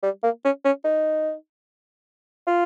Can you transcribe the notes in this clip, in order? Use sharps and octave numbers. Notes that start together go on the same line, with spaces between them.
G3
A#3
C#4
C#4
D#4
F4